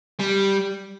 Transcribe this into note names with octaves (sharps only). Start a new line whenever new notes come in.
G3